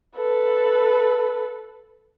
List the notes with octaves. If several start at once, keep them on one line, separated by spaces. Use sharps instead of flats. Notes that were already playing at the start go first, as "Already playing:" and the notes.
A4 B4